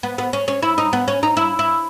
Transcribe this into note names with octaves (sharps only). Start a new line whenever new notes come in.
B3
B3
C#4
C#4
E4
D#4
B3
C#4
D#4
E4
E4